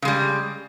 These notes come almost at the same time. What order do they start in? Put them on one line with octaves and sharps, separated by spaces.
C#3 G#3 G3